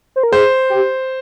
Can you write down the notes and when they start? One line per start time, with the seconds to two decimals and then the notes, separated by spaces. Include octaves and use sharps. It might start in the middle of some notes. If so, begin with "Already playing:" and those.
0.16 C5
0.23 A#4
0.32 G#4 C5
0.70 G4